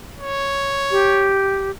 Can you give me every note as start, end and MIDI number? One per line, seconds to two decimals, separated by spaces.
0.18 1.34 73
0.91 1.71 67